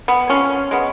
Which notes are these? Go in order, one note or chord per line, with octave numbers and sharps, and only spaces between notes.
B3
F3 C#4
G#3 B3